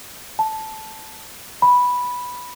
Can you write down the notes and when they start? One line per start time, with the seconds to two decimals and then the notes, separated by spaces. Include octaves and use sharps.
0.39 A5
1.62 B5